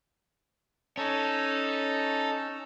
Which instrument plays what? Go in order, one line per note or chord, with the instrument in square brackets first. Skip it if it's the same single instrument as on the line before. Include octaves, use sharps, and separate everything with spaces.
[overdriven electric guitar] C#4 [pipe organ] D#4 A4